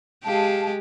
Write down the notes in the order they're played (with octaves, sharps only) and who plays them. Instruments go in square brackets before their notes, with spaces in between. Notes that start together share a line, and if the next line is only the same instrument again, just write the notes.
[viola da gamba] G#3 G4 [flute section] F5 A5